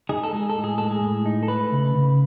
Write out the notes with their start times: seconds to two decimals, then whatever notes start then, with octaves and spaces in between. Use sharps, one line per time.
0.09 D#4 G#4
0.24 A4
0.33 G#3 G#4
0.50 A4
0.55 A2
0.64 G#4
0.78 G#3 A4
0.91 G#4
1.02 A2
1.26 D#4
1.43 A4
1.48 A3 B4
1.72 C#3
1.95 C#3